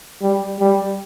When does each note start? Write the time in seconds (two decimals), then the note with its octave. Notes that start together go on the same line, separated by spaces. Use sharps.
0.22 G3
0.60 G3